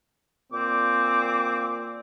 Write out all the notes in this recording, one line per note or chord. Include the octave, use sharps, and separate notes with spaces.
A#2 C4 D6